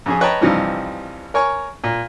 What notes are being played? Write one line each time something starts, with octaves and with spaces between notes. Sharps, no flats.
F2 C#4 G#4
B4 C#5 D#5 G5 A5 A#5
G2 C3 E3 F3 G3 D#4
A#4 C#5 G#5 C#6
A#2